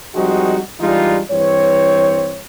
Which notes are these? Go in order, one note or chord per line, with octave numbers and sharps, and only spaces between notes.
F3 G3 G#3 C4 D#4 F#4
E3 G3 G#3 D4 D#4 F4
G2 E3 C4 C#5